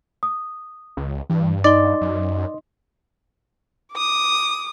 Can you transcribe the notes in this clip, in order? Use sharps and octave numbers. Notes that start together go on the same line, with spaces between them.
D#6
C#2
G2 E3
D#4 D5 D#5 C6 G7
F#2
D6 D#6